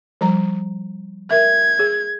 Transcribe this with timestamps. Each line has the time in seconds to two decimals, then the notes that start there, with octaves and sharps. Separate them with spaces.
0.21 F3 G3 A#5
1.31 A#4 E5 G#6
1.79 G#4